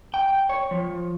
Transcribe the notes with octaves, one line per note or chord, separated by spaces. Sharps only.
G5
C#5
F3